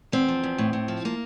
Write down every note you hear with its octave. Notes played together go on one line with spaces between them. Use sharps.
E2 C4
F3
E2
A2
A2
F3
A#3